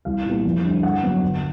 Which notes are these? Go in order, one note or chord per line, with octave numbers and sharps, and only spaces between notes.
C2 F5
A#2 G3 B3
F2
D3 G3
G2 F#5
D3 F#3 B3
G1